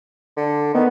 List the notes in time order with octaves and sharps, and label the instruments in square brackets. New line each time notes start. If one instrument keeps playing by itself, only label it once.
[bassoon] D3
[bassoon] D#3 [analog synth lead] B3